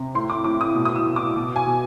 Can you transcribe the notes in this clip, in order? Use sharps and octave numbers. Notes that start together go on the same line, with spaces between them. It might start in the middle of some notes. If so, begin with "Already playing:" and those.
Already playing: C3
A2 C6
D6
A2 D6
D#6
B2
D#6
E6
B2
D6
B2
G#5
B2